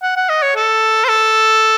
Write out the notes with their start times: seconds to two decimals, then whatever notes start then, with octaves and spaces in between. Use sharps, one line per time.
0.03 F#5
0.16 F#5
0.29 D#5
0.43 C#5
0.56 A4
1.04 C5
1.09 A4